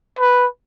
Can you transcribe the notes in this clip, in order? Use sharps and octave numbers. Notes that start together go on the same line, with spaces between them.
B4